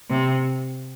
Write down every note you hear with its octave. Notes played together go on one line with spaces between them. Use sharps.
C3